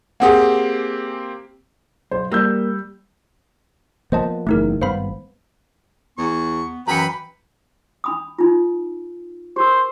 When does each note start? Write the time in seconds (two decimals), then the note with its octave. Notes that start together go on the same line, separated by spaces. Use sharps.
0.20 A#3 C4 G4 G#4 F#5
2.11 B1 C5
2.32 G3 A#3 E6 G6
4.12 F3 A#3 B3 C5 D#5 A5
4.47 F#1 E2 A3 D#4 A#4
4.82 G#1 G2 B3 C5 F5 B5
6.18 E2 B3 C#6
6.88 F#2 E3 B4 G5 A#5 B5 C#7
8.04 D4 B5 D#6
8.39 D#4 F4
9.56 G4 A#4 C5